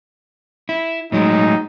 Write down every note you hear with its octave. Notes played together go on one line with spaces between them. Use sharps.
E4
A2 F#3 G#3 D#4